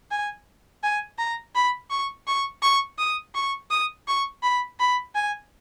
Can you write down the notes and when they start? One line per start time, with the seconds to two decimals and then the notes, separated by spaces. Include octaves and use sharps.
0.11 G#5
0.83 G#5
1.18 A#5
1.55 B5
1.91 C#6
2.28 C#6
2.62 C#6
2.99 D#6
3.35 C#6
3.71 D#6
4.08 C#6
4.43 B5
4.80 B5
5.15 G#5